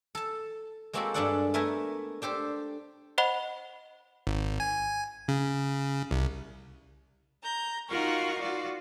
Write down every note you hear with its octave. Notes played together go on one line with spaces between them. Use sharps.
A4 A5
G#3 A#3 C4 F#4 G4 A4
G2 G#3 D4 A4 D5 F#5
A3 B3 A#4 E5 G#5
D4 G4 A4 C5
C5 D#5 F#5 B5 F7 G7
G#1
G#5
C#3
C2
A#5 G6
D#4 F4 F#4 A#4 F#5 C#6
F4 F#4 D5